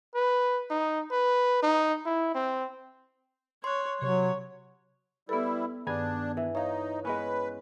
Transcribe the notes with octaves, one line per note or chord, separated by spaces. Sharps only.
B4
D#4
B4
D#4
E4
C4
C#5 C6 F#6
C3 F#3 C#5
G3 B3 E4 A4 B4
G2 D#3 B3 D4 G#4 G#6
E3
D#4 C#5 E5 F5
G#3 B3 C#4 B4